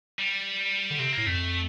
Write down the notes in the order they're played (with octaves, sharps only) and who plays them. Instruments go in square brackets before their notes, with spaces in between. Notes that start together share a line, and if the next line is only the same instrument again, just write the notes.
[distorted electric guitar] G3
[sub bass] D3
[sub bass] C3 [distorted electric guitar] C4
[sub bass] A2 [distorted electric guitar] A#3
[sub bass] F2 [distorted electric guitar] A3